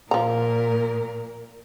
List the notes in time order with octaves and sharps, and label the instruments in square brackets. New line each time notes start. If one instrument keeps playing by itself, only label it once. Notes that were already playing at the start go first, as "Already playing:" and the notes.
[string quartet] A#2 A#4 [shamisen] F3 A#5